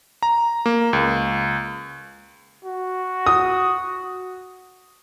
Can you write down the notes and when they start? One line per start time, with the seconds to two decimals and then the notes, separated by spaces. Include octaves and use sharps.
0.23 A#5
0.66 A#3
0.93 C#2
2.65 F#4
3.26 D#6